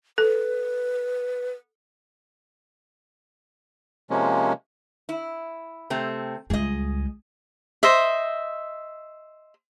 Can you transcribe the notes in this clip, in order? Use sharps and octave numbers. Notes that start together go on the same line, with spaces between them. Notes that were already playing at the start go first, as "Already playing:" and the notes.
A4 B4
C3 F3 G#3 A#3 C#4
E4
C3 A3 C4
C#2 G3 G#4 D#5
C5 D#5 E5